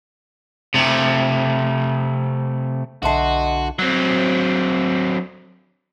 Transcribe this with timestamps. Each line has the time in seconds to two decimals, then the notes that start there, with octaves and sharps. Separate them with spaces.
0.74 C3 A3
3.03 B1 D3 F#4 D#5 E5 A5 C6 C7
3.79 F#3 C4